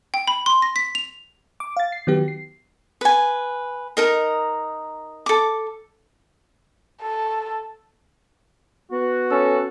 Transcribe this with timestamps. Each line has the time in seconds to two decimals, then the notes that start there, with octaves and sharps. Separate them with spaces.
0.14 G5
0.27 B5
0.46 C6
0.62 A#6
0.76 B6
0.95 F7
1.60 D6
1.77 F5 A6
1.92 C7
2.07 D#3 F#3 B3 G4
2.28 C7
3.01 B4 G#5
3.97 D#4 A#4 D#5
5.26 A4 D6
7.01 A4
8.92 B3 F#4
9.31 C#4 A4